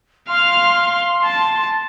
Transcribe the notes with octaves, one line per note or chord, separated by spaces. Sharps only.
F5 C6 F6
A5